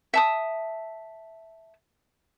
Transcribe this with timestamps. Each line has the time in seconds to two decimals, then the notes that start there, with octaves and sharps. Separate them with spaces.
0.14 E5 A5 D#6